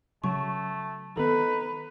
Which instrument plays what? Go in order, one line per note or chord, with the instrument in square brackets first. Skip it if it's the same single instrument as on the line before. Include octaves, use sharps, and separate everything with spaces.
[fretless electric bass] C#3 F#3 [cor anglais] A3 [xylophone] C#6
[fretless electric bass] D#3 B3 [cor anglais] D#4 [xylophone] A4 [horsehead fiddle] B4